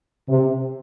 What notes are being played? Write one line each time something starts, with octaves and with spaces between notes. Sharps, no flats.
C3